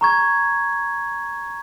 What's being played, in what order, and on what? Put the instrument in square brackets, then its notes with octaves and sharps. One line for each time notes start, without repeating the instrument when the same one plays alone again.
[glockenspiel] A#5 C#6 G#6